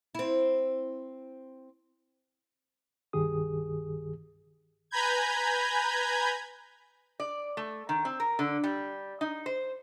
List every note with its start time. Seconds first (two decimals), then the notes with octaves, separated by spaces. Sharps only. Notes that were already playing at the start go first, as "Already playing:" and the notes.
0.15 C4 E4
3.13 C2 G2 D#3 G4 G#4 D#6
4.91 B4 G#5 A#5 B5 G6 G#6
7.20 D5
7.57 A3
7.89 D#3
8.05 C4
8.20 A#4
8.39 D3
8.64 G3
9.21 D#4
9.46 C5